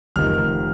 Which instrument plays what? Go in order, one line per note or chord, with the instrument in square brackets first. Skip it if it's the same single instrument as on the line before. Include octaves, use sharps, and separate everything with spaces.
[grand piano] F1 D#3 F6